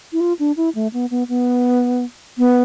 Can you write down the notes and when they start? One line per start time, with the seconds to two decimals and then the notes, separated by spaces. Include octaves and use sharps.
0.13 E4
0.20 F4
0.39 D4
0.57 E4
0.75 A3
0.93 B3
1.11 B3
1.29 B3
2.38 B3